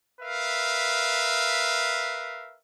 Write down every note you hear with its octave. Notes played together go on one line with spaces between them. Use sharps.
A#4 B4 E5 F5